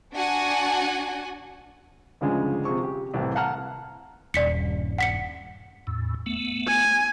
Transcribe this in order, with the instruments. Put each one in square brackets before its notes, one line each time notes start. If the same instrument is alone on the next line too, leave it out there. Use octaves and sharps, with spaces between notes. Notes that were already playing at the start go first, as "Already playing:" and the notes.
[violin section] D4 F#4 F#5 G#5
[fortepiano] D2 G2 C#3 F3 G#3
C3 F3 G#4 C#6
G4
C2 A2 E3
F5 F#5 A5 A#5 F6 F#6
[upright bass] D#1 G2 [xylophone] D5 B6 C#7
[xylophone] F#5 B6 C#7
[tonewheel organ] E2 A2
A3 B3
[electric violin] G#5